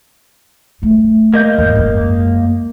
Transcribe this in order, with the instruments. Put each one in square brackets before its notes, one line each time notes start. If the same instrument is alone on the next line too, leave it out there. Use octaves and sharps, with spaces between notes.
[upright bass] A3 F4
[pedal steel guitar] A#3 D#5 G6
[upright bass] E2 G#2
F#2 G#3